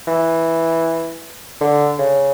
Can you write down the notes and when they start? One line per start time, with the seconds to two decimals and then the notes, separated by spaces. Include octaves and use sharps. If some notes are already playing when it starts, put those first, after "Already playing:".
0.07 E3
1.61 D3
1.99 C#3